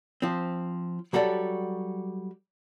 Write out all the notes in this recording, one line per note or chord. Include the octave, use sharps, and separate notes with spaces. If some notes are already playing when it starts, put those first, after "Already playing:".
F3 C4
F#3 G3 F#4 A4 D5